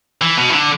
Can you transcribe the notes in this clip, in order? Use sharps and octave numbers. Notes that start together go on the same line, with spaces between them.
E3
B2
E3
D3